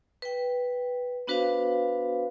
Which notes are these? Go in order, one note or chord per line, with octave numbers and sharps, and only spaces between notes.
B4 G5
B3 D4 F#4 B4 C5 F5